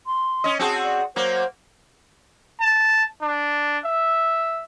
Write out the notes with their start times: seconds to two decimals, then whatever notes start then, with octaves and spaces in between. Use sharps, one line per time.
0.07 C6
0.44 C#4 D#5
0.59 C4 F#4 G#4 A5
0.84 D5
1.16 F#3 A#3 C5
2.61 A5
3.22 D4
3.85 E5